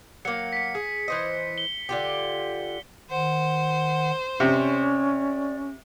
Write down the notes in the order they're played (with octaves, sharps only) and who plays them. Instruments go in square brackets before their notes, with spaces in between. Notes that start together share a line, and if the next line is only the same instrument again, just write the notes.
[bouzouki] F#3 A#3 [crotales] C#7
[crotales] B6 C#7
[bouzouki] G#4
E3 C5 D#5
[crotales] G7
[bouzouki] D3 F4 G4
[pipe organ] D#3 F#5 [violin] C5
[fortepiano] C3 [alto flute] C#4 [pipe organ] D5